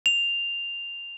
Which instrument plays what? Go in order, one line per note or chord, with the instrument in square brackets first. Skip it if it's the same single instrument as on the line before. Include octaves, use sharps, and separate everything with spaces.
[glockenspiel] F7